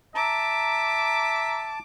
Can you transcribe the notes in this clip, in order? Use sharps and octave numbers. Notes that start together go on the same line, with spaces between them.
E5 A5 A#5 D6